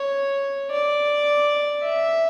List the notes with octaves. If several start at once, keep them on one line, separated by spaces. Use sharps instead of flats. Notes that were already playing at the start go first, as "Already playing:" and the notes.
Already playing: C#5
D5
E5